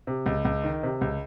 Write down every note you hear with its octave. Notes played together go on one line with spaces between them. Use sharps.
C3
C#2
C#2
D#3
C3
C#2